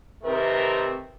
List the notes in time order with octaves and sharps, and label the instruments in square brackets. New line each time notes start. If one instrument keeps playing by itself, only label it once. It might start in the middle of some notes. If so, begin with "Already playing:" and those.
[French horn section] C3 D#3 A3 C4 A#4 B4